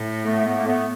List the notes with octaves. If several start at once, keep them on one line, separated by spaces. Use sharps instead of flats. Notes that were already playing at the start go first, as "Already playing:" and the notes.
Already playing: A2
A3 B3
A3 B3
A#3
A3 B3